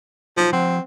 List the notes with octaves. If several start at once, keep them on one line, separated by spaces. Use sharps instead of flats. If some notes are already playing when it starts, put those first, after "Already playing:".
F3 F#3 D#4
F3 C4 F#5